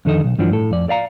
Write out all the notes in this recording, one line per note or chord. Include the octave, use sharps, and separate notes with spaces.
F2 D3 D#3 D#4 A4 D#5
B1
G2 E3 F3 D4 F#4
A2 A4
F2 D5
D5 F5 A#5